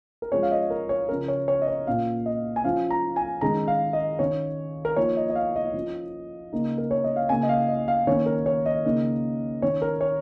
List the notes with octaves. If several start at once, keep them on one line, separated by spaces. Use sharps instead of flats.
A#4
F3 G#3 C#4 C#5
F5
D#5
A#4
C#5
C#3 F3 C#4 A#4
C#5
C#5
D#5
C#5
A#2 A#3 C#4 F5
D#5
G#5
F3 C#4 F5
A#5
G#5
D#3 G#3 C#4 A#5
F5
D#5
D#3 C#4 C#5
A#4
F3 A#3 D#4 C#5
D#5
D#5
F5
D#5
F3 C#4
C#3 A#3 D#4
A#4
C#5
D#5
F5
C#3 A#3 C#4 G#5
D#5
F5
D#5
F5
D#3 A#3 C#4 C#5
A#4
C#5
D#5
C#3 A#3 D#4
D#3 C#4 C#5
A#4
C#5